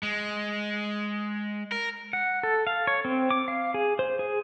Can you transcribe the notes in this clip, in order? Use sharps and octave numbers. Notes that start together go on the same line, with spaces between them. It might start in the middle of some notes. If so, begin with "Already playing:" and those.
G#3
A#4
F#5
A4
F5
C#5
C4
D6
F5
G#4
C5
G#4